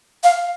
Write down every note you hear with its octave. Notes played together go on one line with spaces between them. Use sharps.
F5